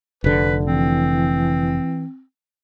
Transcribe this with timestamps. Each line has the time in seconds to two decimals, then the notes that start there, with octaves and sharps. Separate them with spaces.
0.24 F1 D3 B4
0.65 E3 C4